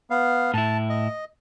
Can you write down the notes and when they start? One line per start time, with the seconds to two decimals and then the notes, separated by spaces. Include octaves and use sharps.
0.10 B3 F5
0.54 A2 E4 A5
0.90 D#5